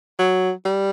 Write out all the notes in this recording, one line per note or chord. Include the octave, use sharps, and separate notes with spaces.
F#3
G3